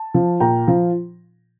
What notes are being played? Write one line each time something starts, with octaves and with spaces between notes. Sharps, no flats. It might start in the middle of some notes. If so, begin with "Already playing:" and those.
Already playing: A5
F3
A#2 G5 A#5
F3